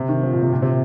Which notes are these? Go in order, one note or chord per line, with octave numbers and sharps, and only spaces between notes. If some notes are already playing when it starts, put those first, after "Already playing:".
Already playing: C3
D#3
F3
A#2
C3
A#2
C3